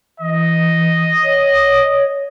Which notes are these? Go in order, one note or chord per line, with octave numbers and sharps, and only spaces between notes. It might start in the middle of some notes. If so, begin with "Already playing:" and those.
E3 D#5
C#5